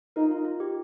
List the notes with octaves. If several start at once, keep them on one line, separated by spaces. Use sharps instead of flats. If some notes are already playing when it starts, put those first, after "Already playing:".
D#4 F4 A#4
F4
F4
G4